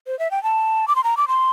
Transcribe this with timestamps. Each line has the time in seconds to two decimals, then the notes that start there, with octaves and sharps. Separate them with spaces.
0.07 C5
0.19 E5
0.31 G5
0.43 A5
0.88 D6
0.96 C6
1.04 A#5
1.17 D6
1.28 C6